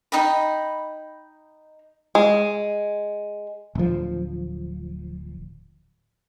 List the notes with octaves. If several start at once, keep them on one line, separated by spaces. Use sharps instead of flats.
D#4 D#5 G5 B5
G#3
D1 F3